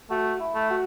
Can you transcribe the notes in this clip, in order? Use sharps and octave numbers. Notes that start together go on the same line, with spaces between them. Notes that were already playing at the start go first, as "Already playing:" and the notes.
A3 F#4
E4
A3
F#4